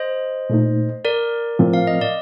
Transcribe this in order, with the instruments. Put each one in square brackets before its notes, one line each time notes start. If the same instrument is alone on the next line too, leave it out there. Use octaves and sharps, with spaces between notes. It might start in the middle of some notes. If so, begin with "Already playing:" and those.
Already playing: [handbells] C5 D#5
[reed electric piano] A#2 A3 D#4
[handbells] A#4 D5
[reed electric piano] A2 F3 C4
[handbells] F5
D#5
D5